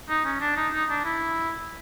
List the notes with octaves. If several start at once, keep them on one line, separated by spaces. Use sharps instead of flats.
D#4
C#4
D4
D#4
D#4
D4
E4